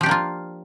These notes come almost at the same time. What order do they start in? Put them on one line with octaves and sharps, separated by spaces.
F3 G4 D4 A#3 F4